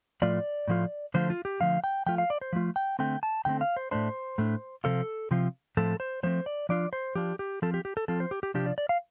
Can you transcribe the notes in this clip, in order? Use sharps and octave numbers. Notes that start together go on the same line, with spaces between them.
A2 F3 A3 F4 D5
A2 F3 A3 F4
D3 F3 A3 F4 C5
F4
G4
D3 F3 A3 F4 F5
G5
F3 A3 F4 G5
F5
D5
C5
F3 A3 F4
G5
D3 A3 C4 G5
A5
D3 A3 C4 G5
F5
C5
A2 A3 D4 C5
A2 A3 D4
C3 F3 C4 F4 A4
C3 F3 C4 F4
A2 F3 A3 C4 A4
C5
A2 F3 A3 C4 C5
D5
F3 D4 F4 D5
C5
F3 D4 F4 G4
G4
F3 C4 F4 A4
G4
G4
A4
F3 C4 F4 A4
C5
G4
G4
C3 F3 D4 F4 G4
D5
D5
F5